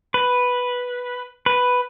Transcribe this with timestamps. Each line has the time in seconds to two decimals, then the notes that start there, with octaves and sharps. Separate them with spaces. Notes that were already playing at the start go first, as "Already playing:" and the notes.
0.14 B4
1.46 B4